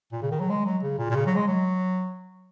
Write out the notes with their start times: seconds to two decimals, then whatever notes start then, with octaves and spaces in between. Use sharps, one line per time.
0.12 A#2
0.22 C#3
0.31 D#3
0.40 F#3
0.50 G#3
0.66 F#3
0.83 C#3
0.98 A#2
1.11 A#2
1.15 C#3
1.26 F#3
1.36 G#3
1.47 F#3